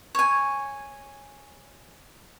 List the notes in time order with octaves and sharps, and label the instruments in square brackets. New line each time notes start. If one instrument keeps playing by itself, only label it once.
[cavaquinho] C#5 G#5